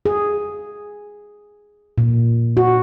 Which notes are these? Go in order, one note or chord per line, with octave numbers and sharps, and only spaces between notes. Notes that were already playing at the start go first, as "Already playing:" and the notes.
G#4
A#2
F#4